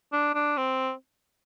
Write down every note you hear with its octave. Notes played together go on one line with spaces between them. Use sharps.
D4
D4
C4